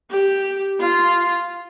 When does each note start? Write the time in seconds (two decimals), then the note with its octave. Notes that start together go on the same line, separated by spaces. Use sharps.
0.11 G4
0.80 F4